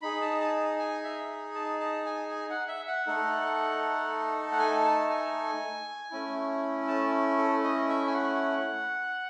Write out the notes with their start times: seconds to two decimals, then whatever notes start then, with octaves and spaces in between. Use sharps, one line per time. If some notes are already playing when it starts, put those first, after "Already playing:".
0.02 D#4 G#4 B5
0.21 A5
0.40 A5
0.79 G#5
1.04 E5
1.55 A5
1.80 A5
2.06 G#5
2.31 G#5
2.50 F#5
2.68 E5
2.87 F#5
3.07 A3 D#4 A4
4.52 F#5
4.59 G#5
4.85 A5
5.10 G#5
6.11 A3 C#4 E4
6.88 A5
7.38 A4
7.64 D#5
7.89 E5
8.07 G#5
8.14 F#5